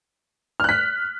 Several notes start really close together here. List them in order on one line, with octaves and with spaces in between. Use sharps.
F6 F#6 B6